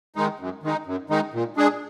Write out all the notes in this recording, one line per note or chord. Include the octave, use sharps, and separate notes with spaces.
D#3 G#3 D#4
F#2
D#3 G#3 D#4
F#2
D#3 G#3 D#4
A#2
G#3 D4 G#4